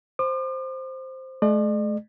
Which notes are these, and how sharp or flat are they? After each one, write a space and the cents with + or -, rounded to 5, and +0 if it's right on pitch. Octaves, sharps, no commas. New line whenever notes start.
C5 +0 D6 +45
A3 -45 D5 +45